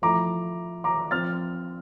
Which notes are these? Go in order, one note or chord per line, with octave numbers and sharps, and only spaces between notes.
F3 A3 E4 A#5 D6
A#5 D6
F3 C4 F4 F6 A6